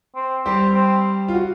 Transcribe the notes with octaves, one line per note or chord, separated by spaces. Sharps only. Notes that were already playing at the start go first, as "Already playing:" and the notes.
C4
G3 C4 G4
C4
F4
F#4